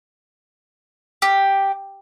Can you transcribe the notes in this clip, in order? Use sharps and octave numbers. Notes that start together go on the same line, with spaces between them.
G4